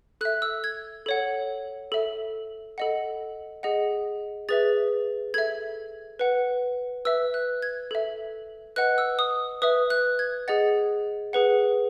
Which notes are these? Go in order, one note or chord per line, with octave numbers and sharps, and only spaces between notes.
A4 E5 F#6
E6
G#6
A4 C#5 F#5
A4 E5
A4 D#5 F#5
G#4 D#5 F#5
G#4 B4 E5 A6
A4 E5 G#6
B4 F#5
B4 E5 E6
F#6
G#6
A4 E5
B4 D#5 F#5 F#6
E6
D#6
B4 E5 D#6
F#6
G#6
G#4 D#5 F#5 A6
G#4 B4 F#5